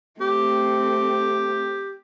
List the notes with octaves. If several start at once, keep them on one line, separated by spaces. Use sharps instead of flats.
A3 C4 G4